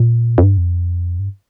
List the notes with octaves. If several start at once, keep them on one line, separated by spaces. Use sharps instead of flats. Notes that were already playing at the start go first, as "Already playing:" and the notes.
Already playing: A#2
F2
G2
F2
G2